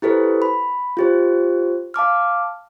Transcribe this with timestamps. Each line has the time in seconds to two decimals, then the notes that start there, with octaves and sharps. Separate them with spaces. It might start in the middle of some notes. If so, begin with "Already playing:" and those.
0.02 E4 G4 A4 B4 C5
0.42 B5
0.97 F4 G4 C5
1.94 F5 A5 D6 F6